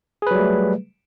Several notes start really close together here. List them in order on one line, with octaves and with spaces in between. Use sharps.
G#4 B4 F#3 G3 A3